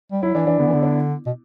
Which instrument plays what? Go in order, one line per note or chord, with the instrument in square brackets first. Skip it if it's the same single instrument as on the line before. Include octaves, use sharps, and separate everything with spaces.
[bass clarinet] G3
[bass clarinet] F#3 [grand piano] E4
[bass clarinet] E3 [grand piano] D4
[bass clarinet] E3 [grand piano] D4
[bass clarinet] D3 [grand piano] B3
[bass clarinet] E3
[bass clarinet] D3 [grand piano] B3
[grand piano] D4
[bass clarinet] B2